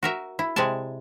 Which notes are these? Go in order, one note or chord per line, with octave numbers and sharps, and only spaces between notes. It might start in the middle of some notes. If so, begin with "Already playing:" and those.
F#4 A#4 E5
E4
C3 G#3 D5 G#5 A5